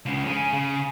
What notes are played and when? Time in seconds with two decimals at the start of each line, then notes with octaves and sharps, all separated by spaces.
0.06 C#2 C#3
0.26 C#4 G#4
0.53 C#3